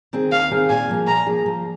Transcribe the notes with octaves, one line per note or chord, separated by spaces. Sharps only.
D#3 C4 G#4
D#2 F5
D#3 C4 G#4
A#2 G#5
F3 A#3 G#4
A#2 A#5
F3 A#3 G#4
F3